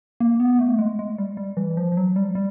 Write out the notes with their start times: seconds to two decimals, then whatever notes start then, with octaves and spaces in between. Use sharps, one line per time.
0.20 A#3
0.40 B3
0.59 A3
0.79 G#3
0.99 G#3
1.18 G3
1.37 G3
1.57 E3
1.77 F3
1.92 F3
1.97 F#3
2.16 G3
2.35 G3